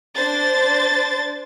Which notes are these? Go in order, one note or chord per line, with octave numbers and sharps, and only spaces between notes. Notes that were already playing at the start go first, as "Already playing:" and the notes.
D4 C5 A6